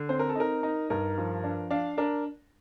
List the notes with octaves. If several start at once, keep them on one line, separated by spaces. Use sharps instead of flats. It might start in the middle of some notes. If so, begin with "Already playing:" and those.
Already playing: D3
C4 C5
A#4
A4
D#4 A#4
D#4
G2 A#4
F3
D4
D4 F5
D4 A#4